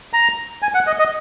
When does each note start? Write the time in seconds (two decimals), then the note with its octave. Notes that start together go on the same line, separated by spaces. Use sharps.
0.13 A#5
0.62 G#5
0.74 F#5
0.87 D#5
0.99 D#5